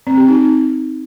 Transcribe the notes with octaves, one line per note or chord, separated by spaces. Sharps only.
C4
G4
D#4